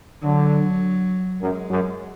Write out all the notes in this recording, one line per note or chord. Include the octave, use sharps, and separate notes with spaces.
D3 F#3
F#2 G#3
F#2